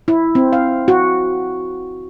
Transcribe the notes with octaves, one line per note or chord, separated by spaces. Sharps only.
E4
C4
F5
F#4